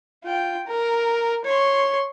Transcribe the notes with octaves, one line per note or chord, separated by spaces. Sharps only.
F4 G5
A#4
C#5 C6